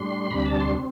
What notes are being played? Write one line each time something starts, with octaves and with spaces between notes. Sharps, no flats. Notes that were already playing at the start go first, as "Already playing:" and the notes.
Already playing: A2 G3 D4 C6
D2 C3 G3 D4 B5
A5
C6
C4